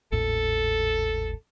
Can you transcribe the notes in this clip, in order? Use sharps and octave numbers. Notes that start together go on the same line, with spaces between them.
G#1 D#2 A2 A4